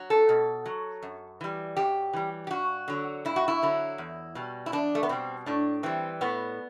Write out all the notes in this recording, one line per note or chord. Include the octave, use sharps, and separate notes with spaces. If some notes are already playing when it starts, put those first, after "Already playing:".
Already playing: F#3
A4
B2
F#3
F#2
E3 G3
F#2 G4
E3 G3
G4
G2 F#4
D3 F#3
G2 E4
F#4
E4
D3 F#3
E2
B2 G3
E4
E2 D4
A3
B3
B2 G3 C4
A2 D4
E3 G3 C4
A2 B3